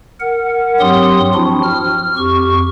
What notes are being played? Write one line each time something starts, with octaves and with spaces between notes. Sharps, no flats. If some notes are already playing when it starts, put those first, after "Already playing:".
A#4 F#5
G2 F#3 C4 G4 C6 D#6
F3 C4 D4 E4 F#4
F6
F2 G4 C#6